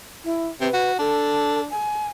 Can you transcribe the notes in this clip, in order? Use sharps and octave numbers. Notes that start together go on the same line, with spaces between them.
E4
C3 B4
F#4
D4 A4
G#5